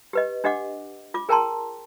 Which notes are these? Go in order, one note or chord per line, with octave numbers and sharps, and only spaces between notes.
G4 B4 D#5
D4 G4 D#5 F#5 D6
F4 D6
G#4 A#4 G5 A5 A#5 C6